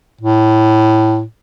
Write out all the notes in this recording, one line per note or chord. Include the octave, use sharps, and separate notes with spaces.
A2